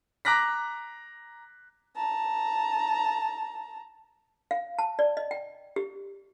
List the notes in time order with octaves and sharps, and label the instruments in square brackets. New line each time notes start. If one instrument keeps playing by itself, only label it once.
[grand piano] A#5 D6 F#6 A#6 B6
[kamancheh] A5 A#5
[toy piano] F5
A5
D5
D#5
G5
G4